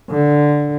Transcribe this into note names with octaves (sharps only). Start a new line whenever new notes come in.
D3